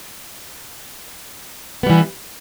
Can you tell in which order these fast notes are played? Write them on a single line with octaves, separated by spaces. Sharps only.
B3 G3 E3